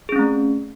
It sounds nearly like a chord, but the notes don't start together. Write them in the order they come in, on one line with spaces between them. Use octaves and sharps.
G#4 C#4 C4 A3